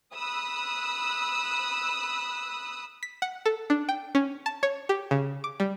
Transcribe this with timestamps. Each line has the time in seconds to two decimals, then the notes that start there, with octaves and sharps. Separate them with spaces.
0.15 B5 D#6 E6 F#6
3.03 B6
3.22 F#5
3.46 A4
3.70 D4
3.89 G5
4.15 C#4
4.46 A5
4.63 C#5
4.89 G4
5.11 C#3
5.44 D6
5.60 G3